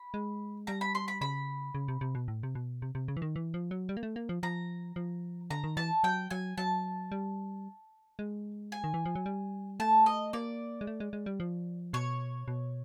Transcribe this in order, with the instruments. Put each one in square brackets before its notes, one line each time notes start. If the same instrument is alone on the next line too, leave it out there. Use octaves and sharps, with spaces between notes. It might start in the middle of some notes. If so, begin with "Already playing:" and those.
Already playing: [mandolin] B5
[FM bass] G#3
[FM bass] G3 [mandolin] A#5
[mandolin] B5
C6
B5
[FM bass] C#3 [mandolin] B5
[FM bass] C#3
C3
C3
B2
A2
C3
B2
C3
C3
C#3
E3
D#3
E3
F3
F#3
G3
A#3
A3
A#3
F3
[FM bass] F3 [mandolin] A#5
[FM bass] F3
[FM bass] D3 [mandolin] A#5
[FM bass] D#3
[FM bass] E3 [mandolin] A5
[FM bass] F#3 [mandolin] G5
[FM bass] F#3 [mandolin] G#5
[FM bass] F#3 [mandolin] A5
[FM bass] G3
G#3
[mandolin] G#5
[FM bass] D#3
E3
F3
F#3
G3
[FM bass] A3 [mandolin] A5
[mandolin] D#5
[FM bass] A#3 [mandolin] D5
[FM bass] G#3
A3
G#3
G#3
G3
F3
[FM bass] B2 [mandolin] C#5
[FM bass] B2